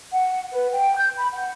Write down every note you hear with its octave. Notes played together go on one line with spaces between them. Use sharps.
F#5
B4
G5
G6
B5
F#5